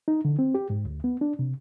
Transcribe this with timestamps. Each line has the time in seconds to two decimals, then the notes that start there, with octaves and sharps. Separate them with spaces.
0.08 D#4
0.25 D3
0.39 C4
0.55 G4
0.70 G#2
0.85 D2
1.04 B3
1.21 D4
1.39 C3